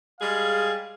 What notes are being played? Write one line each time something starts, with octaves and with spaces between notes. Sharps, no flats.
G3 G#3 G#4 F5